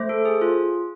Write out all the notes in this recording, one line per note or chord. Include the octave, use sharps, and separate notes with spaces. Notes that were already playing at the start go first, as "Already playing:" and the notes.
Already playing: A3 C5
A4
G#4
F4